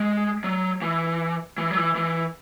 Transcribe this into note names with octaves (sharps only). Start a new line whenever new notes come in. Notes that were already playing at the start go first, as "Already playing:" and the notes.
Already playing: G#3
F#3
E3
E3
F#3
E3
E3